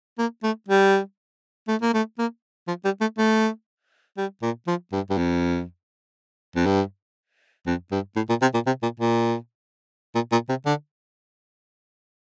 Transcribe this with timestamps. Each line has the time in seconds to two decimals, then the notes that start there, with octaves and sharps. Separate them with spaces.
0.18 A#3
0.43 A3
0.69 G3
1.68 A3
1.82 A#3
1.94 A3
2.19 A#3
2.68 F3
2.85 G3
3.01 A3
3.18 A3
4.18 G3
4.42 A#2
4.67 F3
4.92 G2
5.10 G2
5.18 F2
6.56 F2
6.66 G2
7.66 F2
7.92 G2
8.16 A2
8.29 A#2
8.42 C3
8.54 A#2
8.66 C3
8.83 A#2
9.00 A#2
10.15 A#2
10.32 A#2
10.49 C3
10.66 D3